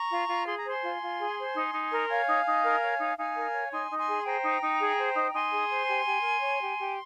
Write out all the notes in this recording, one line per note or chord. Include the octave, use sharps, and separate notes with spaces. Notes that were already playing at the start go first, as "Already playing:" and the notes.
Already playing: A#5 C#6
F4
F4
G#4 C6
A#5
C5 G#5 C6
F4
F4
G#4
C5
D#4
D#4
A#4
C#5 F5 G#5
D#4
D#4
A#4
C#5
D#4
D#4 F5 G#5
A#4
C#5
D#4 G#5 C6
D#4
G#5 C6
G#4
C5 G5 A#5
D#4
D#4
G#4
C5
D#4
D#4 G#5 C6
G#4
C5
G4
G4
A#4
C#5
G4
G4